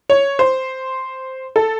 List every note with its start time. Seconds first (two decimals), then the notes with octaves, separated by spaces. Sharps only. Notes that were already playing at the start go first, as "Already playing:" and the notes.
0.10 C#5
0.39 C5
1.56 A4